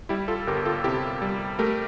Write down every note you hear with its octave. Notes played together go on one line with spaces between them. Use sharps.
G3 E4 G4
F4 A4
G1 G4 A#4
F4 A4
C3 E4 G4
G3
A3 G4 A#4